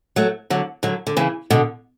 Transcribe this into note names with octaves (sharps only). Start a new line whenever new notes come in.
F#3 A3
D3 F#3
D3 F#3
D3
C#3 E3
B2 D3